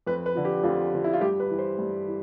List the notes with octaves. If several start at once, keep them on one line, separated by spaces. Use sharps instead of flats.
F2 B4
B4
D3 F3
G4
F2 F4
D3 F3
E4
F4
G2 G4
B4
E3
C5
G2
E3